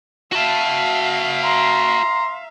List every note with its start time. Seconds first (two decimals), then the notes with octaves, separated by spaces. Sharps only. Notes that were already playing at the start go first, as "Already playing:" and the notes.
0.32 F#4 E5 F5 A5
1.44 A#5 C6